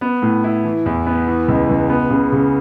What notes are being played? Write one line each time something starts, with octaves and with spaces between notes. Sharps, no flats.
B3
A2
E4
E3
E2
B3
E3
C#2
C#2
B3
C#3
C#3